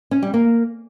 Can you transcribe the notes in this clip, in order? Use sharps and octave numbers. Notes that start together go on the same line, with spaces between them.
C#4
G3
A#3